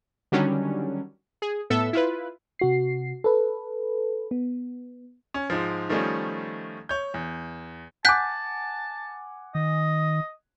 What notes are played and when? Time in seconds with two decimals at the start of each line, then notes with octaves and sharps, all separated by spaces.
0.32 D3 D#3 F#3 G3 C#4 D4
1.42 G#4
1.70 A2 B3 A4 E5 E6
1.93 E4 F4 B4
2.59 C3 F#4 C7
3.24 A4 B4
4.31 B3
5.34 C#4
5.50 G#2 F3
5.89 D#3 F3 G3 A3 C#4 D#4
6.89 C#5 G6
7.14 E2
8.05 F#5 G#5 A5 D6 F#6 G6 B6
9.55 D#3 D#5